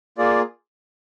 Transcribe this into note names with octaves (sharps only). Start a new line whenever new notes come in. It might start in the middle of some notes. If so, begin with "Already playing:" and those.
A#3 F4 G#4 D5